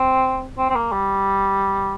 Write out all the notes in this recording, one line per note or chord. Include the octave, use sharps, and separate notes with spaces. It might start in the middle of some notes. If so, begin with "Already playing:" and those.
Already playing: C4
C4
C4
A#3
G3